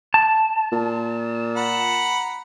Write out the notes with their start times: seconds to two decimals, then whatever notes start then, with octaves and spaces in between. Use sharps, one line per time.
0.14 A5
0.72 A#2
1.57 F#5 A#5 B5